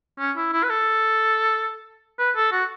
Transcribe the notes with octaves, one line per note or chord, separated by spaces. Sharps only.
C#4
E4
E4
B4
A4
B4
A4
F#4